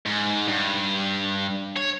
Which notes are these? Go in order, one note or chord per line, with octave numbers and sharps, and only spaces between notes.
G#2
G2
C#5